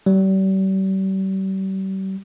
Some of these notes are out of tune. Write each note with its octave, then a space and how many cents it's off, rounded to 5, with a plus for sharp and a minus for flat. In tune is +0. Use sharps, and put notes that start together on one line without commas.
G3 -40